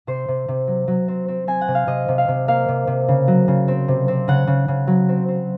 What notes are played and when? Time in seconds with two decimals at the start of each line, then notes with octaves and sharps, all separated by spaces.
0.07 C3 C5
0.28 C3
0.48 C3
0.67 F#3
0.87 F#3
1.08 C4
1.28 C4
1.47 C4 G#5
1.61 F#5
1.68 C3
1.75 F5
1.87 C3 D#5
2.08 C3
2.18 F5
2.28 C3
2.48 A#3 F5
2.68 C3
2.87 C3
3.08 C#3
3.28 F#3
3.48 C#3
3.68 C4
3.88 C3
4.08 C4
4.28 C#3 F#5
4.47 C#3
4.68 C#3
4.87 F#3
5.09 C4
5.28 C4